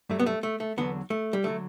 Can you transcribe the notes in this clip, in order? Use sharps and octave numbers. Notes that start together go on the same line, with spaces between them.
G2 F#3 A3
B3
A3
A3
A3
E2 D3 F#3 B3
A3
G3
D3 F#3 A3